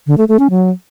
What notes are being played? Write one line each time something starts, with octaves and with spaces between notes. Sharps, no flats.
D3
A3
A3
C#4
F#3